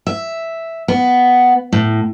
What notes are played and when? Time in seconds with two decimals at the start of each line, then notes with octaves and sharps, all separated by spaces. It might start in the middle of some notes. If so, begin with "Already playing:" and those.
0.07 E5
0.88 B3
1.72 A2